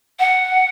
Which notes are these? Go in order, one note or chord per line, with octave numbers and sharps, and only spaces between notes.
F#5